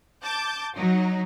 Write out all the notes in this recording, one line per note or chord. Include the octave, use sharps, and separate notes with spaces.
A5 D6 G6 A6
F#3 D#4